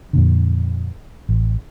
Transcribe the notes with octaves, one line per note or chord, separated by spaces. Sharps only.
F2 A#2 D3
A1